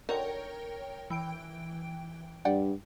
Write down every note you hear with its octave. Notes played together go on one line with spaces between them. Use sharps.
D3 D#4 F#4 A#4 C#5 G5
E3 G5 D7
G2 D5 F#5 G5